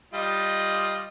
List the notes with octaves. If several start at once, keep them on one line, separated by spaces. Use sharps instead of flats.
G3 F4 D#5